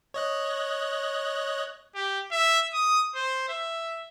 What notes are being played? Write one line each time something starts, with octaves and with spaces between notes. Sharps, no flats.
C#5 D#5 F#6
G4
E5
D#6
C5
E5